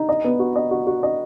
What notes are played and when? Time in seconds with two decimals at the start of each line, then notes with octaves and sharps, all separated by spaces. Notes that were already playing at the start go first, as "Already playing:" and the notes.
Already playing: D#4
0.09 D#5
0.24 B3
0.39 F#4
0.56 D#5
0.71 F#4
0.87 F#4
1.03 D#5